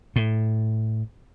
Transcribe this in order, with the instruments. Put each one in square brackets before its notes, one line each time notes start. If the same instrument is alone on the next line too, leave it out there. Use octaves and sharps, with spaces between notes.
[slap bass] A2